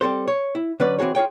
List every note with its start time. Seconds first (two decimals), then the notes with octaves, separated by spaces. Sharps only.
0.01 G3 C4 A4 C5
0.28 C#5
0.55 E4
0.80 D3 F#3 C#4 B4 D5
0.99 E3 C4 F#4 G#4 C#5
1.15 F4 G#4 C#5 G5